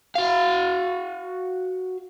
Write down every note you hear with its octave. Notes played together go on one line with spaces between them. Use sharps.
F#4 F5